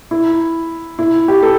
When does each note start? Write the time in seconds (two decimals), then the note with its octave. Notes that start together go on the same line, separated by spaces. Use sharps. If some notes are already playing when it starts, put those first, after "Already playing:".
0.11 E4
0.99 E4
1.28 G4
1.43 A4